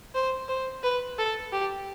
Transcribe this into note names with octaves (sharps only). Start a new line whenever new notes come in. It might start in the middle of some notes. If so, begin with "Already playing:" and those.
C5
C5
B4
A4
G4